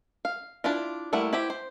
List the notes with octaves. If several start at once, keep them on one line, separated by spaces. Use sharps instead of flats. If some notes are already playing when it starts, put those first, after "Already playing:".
F5
D4 E4 F4
G3 A3 A#3 E4 F#5
E4 G4 C5
C5